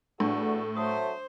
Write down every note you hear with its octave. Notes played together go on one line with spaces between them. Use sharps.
E2 A2 D3 D4 F#4 A4
F#3 A3 C5 D#6